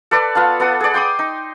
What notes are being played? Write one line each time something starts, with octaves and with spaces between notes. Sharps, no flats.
A4 B4 D5
B3 F4 F5 A5
B3 A4 F#5 D#6
G#4 D5
G5 C6 D6 D#6
D#4